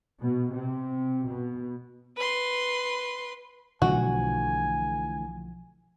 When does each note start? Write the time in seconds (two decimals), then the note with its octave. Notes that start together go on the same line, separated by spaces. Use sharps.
0.20 B2
0.52 C3
1.26 B2
2.16 B4 C6
3.82 B1 D3 E3 F3 A3 F#4 G#5